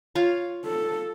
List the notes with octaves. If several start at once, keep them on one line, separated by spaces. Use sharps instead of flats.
F4 C#5 F5
A4